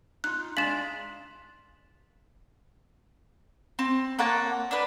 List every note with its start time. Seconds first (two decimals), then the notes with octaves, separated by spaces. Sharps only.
0.24 D#4 F4 F#6
0.57 G#3 D4 F5 C6 A6 B6 E7 F#7
3.79 C4
4.19 A#3 C#5 F#5 A5
4.71 D4 B4